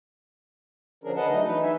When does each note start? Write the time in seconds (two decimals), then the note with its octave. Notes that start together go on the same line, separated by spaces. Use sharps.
1.04 D3 F3 C#4 D4 G#4 A#4
1.16 D3 G#4 B4 D#5 F#5 A5
1.28 F#3 A3 D4 D#4 D#5
1.44 E3 D#4 B4
1.62 E5 G#5